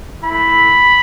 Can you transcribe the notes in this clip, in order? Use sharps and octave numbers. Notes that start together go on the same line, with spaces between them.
A3 E4 B5